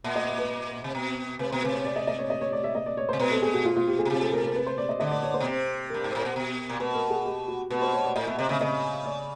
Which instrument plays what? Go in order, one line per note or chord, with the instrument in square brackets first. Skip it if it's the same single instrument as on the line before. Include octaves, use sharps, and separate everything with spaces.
[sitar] A#2 [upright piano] E5
[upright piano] D#5
E5
B4
[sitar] C3
B2
[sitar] C3 [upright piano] B4
[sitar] B2 [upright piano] C5
[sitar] C3 [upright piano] B4
[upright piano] C#5
D5
D#5
D#5
C#5
D#5
C#5
D5
E5
D#5
D5
C#5
[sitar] C3 [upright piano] C5
[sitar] B2 [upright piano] B4
[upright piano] A4
G#4
F#4
F4
F4
G4
G#4
[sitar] B2
[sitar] C3 [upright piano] G4
[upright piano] A4
A#4
A#4
B4
C5
D5
D#5
[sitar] D3 [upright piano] D#5
[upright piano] D5
C#5
C5
[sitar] B2
C3
[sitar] G2 [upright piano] A#4
[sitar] G#2
A2
A#2
B2
A#2
[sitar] B2 [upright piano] B4
[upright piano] A#4
G#4
G4
F#4
[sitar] B2 [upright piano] B4
[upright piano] C5
C#5
D5
[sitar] A2 [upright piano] D#5
[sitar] B2 [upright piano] E5
[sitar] C3 [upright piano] D#5
[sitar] C#3 [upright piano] E5
[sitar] C#3 [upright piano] D#5
[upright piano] D5